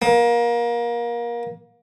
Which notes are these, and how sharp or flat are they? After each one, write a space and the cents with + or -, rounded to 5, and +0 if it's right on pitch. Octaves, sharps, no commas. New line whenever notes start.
A#3 +25